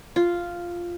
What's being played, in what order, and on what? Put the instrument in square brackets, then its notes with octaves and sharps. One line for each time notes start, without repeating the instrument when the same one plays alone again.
[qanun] F4